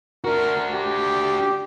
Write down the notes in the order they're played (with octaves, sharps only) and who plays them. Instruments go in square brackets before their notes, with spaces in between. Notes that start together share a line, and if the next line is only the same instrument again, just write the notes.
[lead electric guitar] D4 F#4 [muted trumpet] A#4
[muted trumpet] G4